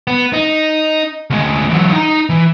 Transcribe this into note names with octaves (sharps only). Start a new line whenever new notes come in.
B3
D#4
D2 G#3
E3 F#3
D#4 A#5
E3